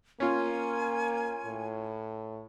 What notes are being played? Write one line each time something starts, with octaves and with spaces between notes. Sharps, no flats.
A#3 C#4 F4 G#5
A2